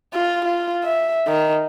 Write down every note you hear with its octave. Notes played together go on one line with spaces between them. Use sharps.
F4
F4
E5
D#3